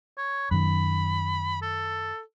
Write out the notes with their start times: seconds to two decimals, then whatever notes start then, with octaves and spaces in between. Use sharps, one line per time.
0.18 C#5
0.51 F#2 D#3 B5
1.62 A4